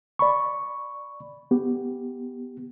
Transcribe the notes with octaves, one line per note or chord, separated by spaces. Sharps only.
D5 B5 C#6
B3 G4